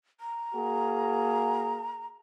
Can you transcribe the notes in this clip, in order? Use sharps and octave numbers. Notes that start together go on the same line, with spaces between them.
A#5
A#3 F#4 G#4